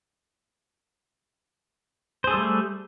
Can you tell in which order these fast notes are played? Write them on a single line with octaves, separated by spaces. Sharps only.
C5 G#4 A4 G3 A3